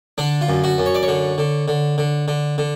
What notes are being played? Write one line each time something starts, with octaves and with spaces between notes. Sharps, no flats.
D3 D4
F4
F#2
F#4
F#2
C#5
D5
C#5
D3
D3
D3
D3
D3
D3